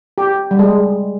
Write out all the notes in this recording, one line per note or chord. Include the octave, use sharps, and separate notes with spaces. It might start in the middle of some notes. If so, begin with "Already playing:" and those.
G4
G3
G#3